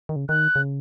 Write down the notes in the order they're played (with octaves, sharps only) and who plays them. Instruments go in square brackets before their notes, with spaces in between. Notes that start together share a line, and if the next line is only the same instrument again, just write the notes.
[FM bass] D#3
C#3
[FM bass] D#3 [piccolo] F#6
[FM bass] C#3